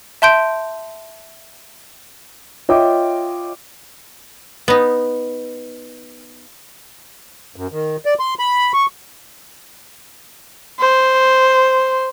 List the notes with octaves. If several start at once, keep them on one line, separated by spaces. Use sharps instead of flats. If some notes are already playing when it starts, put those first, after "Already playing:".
E5 A5 C6 G6 D7
F4 C#5 D#5 E5 G5 D6
B3 D#4
F#2
D#3
D5
C6
B5
C#6
C5